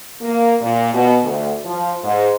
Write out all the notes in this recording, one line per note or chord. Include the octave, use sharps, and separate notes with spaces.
A#3
A#2
B2
D2
F3
G#2